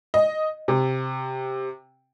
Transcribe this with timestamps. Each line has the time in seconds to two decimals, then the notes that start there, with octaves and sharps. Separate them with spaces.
0.14 D#5
0.68 C3